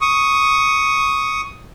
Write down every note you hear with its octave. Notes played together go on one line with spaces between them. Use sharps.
C#6 D#6